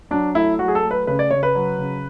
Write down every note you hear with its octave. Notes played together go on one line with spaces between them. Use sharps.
F#3 D4
A3 E4
F#3 F#4
G#4
A4
A3
B4
C#3 B4
D5
C#3 C#5
B4
F#3
C#3